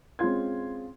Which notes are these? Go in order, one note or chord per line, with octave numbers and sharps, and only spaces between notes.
G#3 C4 C#4 F4 C6 G#6